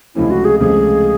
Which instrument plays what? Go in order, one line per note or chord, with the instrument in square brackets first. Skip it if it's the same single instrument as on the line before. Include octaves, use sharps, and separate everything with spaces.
[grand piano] C#2 C3 F3 A3 C#4 [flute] E4
[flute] F#4
G#4
[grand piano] C#2 C3 F3 A3 C#4 [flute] G#4